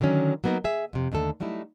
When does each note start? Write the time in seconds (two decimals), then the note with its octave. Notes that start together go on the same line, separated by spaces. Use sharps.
0.01 D3 D#3 F#3 C#4
0.44 F#3 A#3 B3 D#4 A#4
0.64 G#4 E5
0.93 F2 C3
1.12 D#2 D3 A3 A4
1.40 F#3 G3 A3 D#4 E4